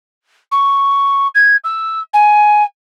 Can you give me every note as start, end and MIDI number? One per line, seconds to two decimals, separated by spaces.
0.51 1.27 85
1.35 1.56 92
1.64 2.00 88
2.13 2.63 80